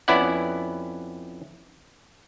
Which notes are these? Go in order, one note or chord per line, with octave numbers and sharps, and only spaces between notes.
F2 B3 C#4 E4 D5 F#5